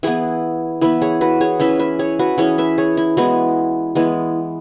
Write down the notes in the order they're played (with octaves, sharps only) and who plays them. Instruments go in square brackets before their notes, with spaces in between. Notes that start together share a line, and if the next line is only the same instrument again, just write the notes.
[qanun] E3 B3 E4 G#4
E3 B3 B4 E5
G#4 C#5
F#4 B4
G#4 C#5
E3 C#4 B4 E5
B4 E5
G#4 C#5
F#4 B4
E3 C#4 G#4 C#5
B4 E5
G#4 C#5
E4
E3 G#3 B3 F#4
E3 G#3 B3